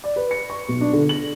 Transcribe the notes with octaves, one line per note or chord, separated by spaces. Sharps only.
D5
B4
C#7
C#6
B1
D4
D3
F#7